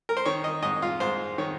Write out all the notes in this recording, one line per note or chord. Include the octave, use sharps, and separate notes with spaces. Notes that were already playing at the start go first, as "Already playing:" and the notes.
A#4
C5
D#3 C#5
D#5
G#2 D#5
F4
G#2 C5
D#3 C#5